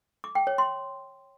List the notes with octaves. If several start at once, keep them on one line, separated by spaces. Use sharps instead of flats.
D6
G5
C#5
C6